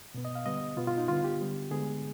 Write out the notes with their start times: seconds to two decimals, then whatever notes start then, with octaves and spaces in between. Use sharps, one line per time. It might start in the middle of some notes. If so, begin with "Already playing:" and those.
0.14 B2 B3
0.25 D#5
0.35 F5
0.46 D3 G3 B3 D#5
0.77 B2 B3 F4
0.87 F4
0.98 D#4
1.08 D3 G3 B3 F4
1.24 G4
1.40 D3 G3 B3
1.71 D3 G#3 B3 G#4